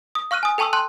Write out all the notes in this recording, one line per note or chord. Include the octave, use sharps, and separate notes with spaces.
D#6
F5 C#6 F6 F#6 D#7
G#5 D#6
A4 G5 A5 C#6 D#6 E6
G5 A5 C6 F#6